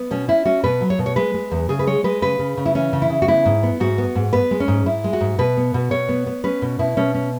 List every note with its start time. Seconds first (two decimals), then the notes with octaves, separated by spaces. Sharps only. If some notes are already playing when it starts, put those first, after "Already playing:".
Already playing: B3
0.11 B2 C#4
0.28 C#4 E4
0.45 C#4 F#4
0.64 B2 B4
0.81 F#3
0.90 C#5
0.99 B2
1.06 C#5
1.16 G#3 B4
1.34 G#3
1.51 E2
1.69 C#3 G#4
1.79 B4
1.87 G#3 C#5
2.04 G#3 B4
2.22 C#3 B4
2.39 C#3
2.57 C#3
2.66 E4
2.75 E3 C#4
2.93 C#3
3.02 E4
3.10 C#3
3.22 F#4
3.28 B3 E4
3.45 G#2
3.63 B3
3.80 G#2 F#4
3.98 B3
4.15 G#2
4.33 B3 B4
4.51 G#3
4.60 C#4
4.68 G#2
4.86 G#2 E4
5.04 G#3
5.13 F#4
5.21 G#2
5.39 B2 B4
5.57 B3
5.74 B2
5.91 B2 C#5
6.09 B3
6.27 B3
6.44 C#4 B4
6.62 B2
6.79 B2 E4
6.97 B2 C#4
7.14 C#4